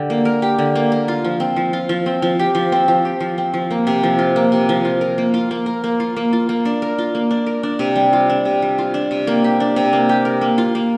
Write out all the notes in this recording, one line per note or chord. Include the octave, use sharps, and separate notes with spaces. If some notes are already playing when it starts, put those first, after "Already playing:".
Already playing: D3 G4
A#3
A#4
G4
D3
A#3
A#4
F4
F3
C4
F3
F4
F3
C4
F3
G4
F3
C4
F3
G4
F3
C4
F3
A#3
C3
F3
F4
A#3
C3
F3
F4
A#4
A#3
F4
A#3
A#4
A#3
F4
A#3
F4
A#3
D4
A#4
F4
A#3
D4
A#4
D4
C3
G3
F4
D4
C3
G3
F4
D4
C3
A#3
G4
D4
C3
A#3
G4
A#4
A#3
F4
A#3